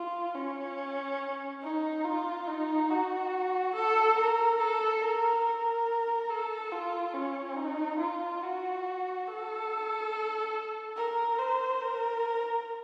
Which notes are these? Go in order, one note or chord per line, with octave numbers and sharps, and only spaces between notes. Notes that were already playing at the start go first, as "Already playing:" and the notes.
Already playing: F4
C#4
D#4
F4
D#4
F#4
A4
A#4
A4
A#4
A#4
A4
F4
C#4
D#4
F4
F#4
A4
A#4
C5
A#4